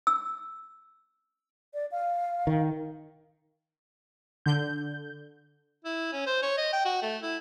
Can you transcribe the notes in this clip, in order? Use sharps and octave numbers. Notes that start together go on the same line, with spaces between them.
E6
D5
F5
D#3
D3 G6
E4
C#4
C5
C#5
D#5
G5
F#4
A3
E4